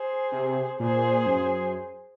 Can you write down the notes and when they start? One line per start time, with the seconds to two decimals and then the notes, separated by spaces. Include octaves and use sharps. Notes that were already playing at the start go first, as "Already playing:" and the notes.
Already playing: G#4 C5
0.32 C3
0.80 A#2 G#4 C5
1.26 F#2